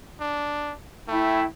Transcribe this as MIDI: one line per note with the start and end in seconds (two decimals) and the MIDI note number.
0.20 0.73 62
1.08 1.45 57
1.08 1.44 64
1.08 1.44 79